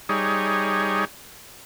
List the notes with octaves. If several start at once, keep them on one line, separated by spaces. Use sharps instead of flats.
G3 D#4 G#4 C#5